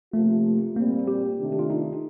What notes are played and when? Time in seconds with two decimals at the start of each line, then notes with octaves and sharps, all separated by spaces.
0.13 C3 F3 A3 A#3 F4
0.76 A#2 G3 A#3 C4
1.08 G4
1.39 C3 D#3 A3 D4
1.59 F4
1.70 D#4